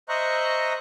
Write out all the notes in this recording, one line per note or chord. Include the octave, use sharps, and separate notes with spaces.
C5 D#5 E5 A#5 C#6 F#6